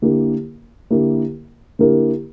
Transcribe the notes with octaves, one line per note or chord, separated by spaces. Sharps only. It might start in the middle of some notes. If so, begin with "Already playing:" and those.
D3 A#3 E4 G4 A#4
D3 A#3 E4 G4 A#4
D3 A#3 E4 G4 A#4